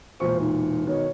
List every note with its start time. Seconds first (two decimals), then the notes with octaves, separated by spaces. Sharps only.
0.20 E1 A#2 C5 C#6
0.40 D#4
0.87 B2 D#3 C#5